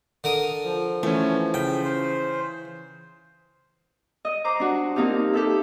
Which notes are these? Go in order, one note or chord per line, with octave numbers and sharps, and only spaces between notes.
D3 A#4 D#6
F3
E3 A3 C#4
C#3 G5
C5
D#5
C5 A#5 D6
D4 F#4
A#3 C4 D#4 F4 G4
G4 A4 E5